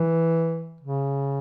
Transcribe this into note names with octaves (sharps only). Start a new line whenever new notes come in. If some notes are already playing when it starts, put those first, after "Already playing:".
Already playing: E3
C#3